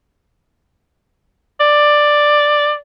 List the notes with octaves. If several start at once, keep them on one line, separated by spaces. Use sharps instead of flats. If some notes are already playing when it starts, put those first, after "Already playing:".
D5